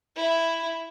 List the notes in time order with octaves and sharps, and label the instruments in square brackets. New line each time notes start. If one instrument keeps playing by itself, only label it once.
[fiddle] E4